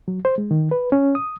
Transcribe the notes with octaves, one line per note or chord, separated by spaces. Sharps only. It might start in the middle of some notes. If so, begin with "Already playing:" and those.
F#3
C5
G#3
D#3
B4
C#4
D#6